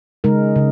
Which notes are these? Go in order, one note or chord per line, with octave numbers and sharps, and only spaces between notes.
C#3 G#3 D#4 A#4
C#3